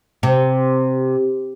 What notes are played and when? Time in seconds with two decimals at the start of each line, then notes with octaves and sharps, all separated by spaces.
0.23 C3